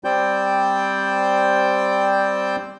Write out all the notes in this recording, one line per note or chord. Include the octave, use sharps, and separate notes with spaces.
G3 C4 C5 D5 G5 G6